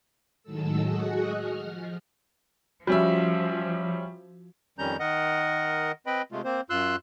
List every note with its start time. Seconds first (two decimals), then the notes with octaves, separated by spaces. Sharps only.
0.43 A2 D#3 F#3 G#3 A4 E6
0.81 F#4 G#4 D#5 F#5
1.33 F6
1.62 F3
2.87 F3 G3 C#4 F#4 E5
4.79 F2 D#3 G3 C#4 A#5 G6
4.99 D#3 A#4 D#5 F#5
6.06 C4 B4 D#5 G5 B5
6.32 C3 G#3 A3 F4
6.44 A#3 C4 C5
6.70 F#2 F4 C6 E6 F#6